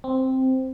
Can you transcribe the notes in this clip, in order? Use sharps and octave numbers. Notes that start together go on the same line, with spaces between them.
C4